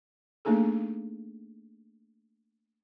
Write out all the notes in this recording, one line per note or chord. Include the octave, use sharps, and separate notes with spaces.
A3 A#3 D4 D#4 G#4 A4